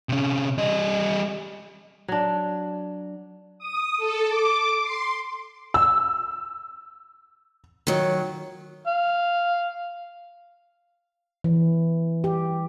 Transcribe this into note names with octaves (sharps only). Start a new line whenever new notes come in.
C3 C#4
G3 D#5
F#3 D4
D#6
A4
D6
C6
E6
D#3 F#3
F5
E3
G4